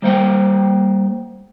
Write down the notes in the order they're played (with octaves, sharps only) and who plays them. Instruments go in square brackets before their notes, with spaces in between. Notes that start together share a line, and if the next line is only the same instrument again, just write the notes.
[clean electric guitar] G3 A#3 C5 E5 F#5 G5